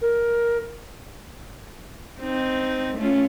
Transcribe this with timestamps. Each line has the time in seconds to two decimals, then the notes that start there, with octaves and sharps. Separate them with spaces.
0.01 A#4
2.21 C4 D#4
2.97 A3 C#4 F4